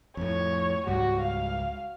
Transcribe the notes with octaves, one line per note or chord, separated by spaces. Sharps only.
F2 A2 C#5
C#2 G#2 G3 F#4
F5